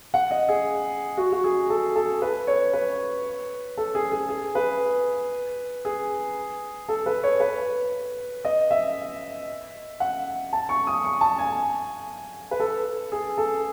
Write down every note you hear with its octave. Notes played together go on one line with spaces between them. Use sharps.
F#5
D#5
G#4
F#4
F#4
G#4
A4
A4
B4
C#5
B4
A4
G#4
G#4
G#4
B4
G#4
A4
B4
C#5
B4
D#5
E5
F#5
A5
C#6
D#6
C#6
A5
G#5
B4
A4
G#4
A4